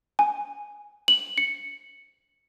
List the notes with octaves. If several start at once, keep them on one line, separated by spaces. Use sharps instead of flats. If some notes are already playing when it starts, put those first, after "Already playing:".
G#5
F#7
C#7